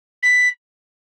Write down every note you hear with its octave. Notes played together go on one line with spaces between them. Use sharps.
B6